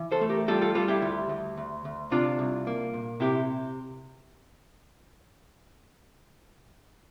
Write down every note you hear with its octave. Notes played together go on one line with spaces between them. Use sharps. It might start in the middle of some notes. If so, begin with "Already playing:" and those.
Already playing: E3
A4 C5
A3
G4 A#4
G3 F4 A4
F4 A4
G3 F4 A4
E4 G4
D2
D2
D2
D2
C3 D4 F4
C2
A#3
A#2
C3 E4 G4